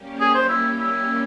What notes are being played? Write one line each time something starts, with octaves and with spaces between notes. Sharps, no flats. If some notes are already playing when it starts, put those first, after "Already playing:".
Already playing: G3 A#3 C#4 G4
G#4
C5
E4
E4